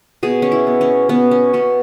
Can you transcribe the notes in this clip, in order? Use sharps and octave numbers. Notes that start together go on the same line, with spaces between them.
B2 G#4
C#4
E4
B3
C#4
B2 B3
C#4
B2 C#4